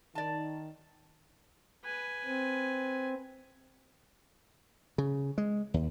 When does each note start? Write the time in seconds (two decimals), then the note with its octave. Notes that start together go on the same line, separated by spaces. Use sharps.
0.15 D#3 D5 A5
1.85 B4 G#5
2.26 C4
4.98 C#3
5.38 G#3
5.74 D#2